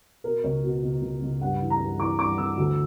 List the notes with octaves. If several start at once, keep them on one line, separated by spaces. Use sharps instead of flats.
B2 A#4
C#2 C#5
B2
C#2
C#2
C#2
G2 F#5
E3
A#5
G2
E3 D6
G2 D6
E3 E6
D2